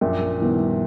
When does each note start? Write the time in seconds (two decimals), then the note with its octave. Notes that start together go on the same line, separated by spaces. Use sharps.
0.01 A#1 F#2 A#2
0.41 D#3 G3 B3 E4